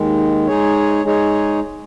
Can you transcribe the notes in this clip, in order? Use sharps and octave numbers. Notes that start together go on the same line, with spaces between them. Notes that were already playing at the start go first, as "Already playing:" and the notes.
Already playing: D#2 D#3 G#3
G#3 D#4 G#4 C#5
G#3 D#4 G#4 C#5